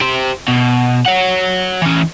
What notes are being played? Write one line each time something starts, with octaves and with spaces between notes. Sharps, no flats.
G4 C5
B2
C#5 F#5
E3 C#4